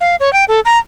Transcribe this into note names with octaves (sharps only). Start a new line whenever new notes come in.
F5
C#5
G5
A4
A#5